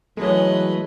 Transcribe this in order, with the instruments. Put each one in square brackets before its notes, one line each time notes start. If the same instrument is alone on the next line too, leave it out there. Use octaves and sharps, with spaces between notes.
[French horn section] E3 F#3 [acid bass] G#3 [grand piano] A3 C#5 [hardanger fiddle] B4 D#5